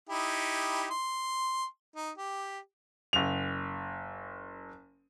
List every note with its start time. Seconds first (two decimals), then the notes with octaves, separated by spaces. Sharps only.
0.09 D#4 E4 G4
0.90 C6
1.96 D#4
2.18 G4
3.13 F#1 F7